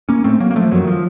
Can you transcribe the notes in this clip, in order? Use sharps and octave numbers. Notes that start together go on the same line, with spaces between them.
A#3 C#4
A2 A3 C4
F#3 A#3
A#3
F3 A3
F#2 D#3 F#3
F3